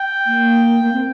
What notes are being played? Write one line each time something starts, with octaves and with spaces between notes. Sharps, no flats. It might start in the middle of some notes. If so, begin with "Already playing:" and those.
Already playing: G5
A#3
A#3
C4